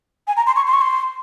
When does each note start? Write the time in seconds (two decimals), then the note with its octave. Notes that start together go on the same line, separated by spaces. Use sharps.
0.27 G#5
0.36 A#5
0.46 C6
0.55 C#6
0.66 C6
0.73 C#6
0.81 C6